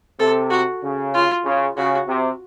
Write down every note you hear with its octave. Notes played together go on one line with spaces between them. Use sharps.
C3 A4
F#4
C#3
F4
C#3
C#3 F#4
C3